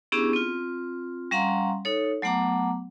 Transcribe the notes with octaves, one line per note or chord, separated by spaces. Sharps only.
B3 C#4 D4 E4 G4 G#4
C4 F4
G3 C#4 F5 F#5 A#5 C6
D#4 A4 C#5
F#3 A3 B3 F#5 A#5 D6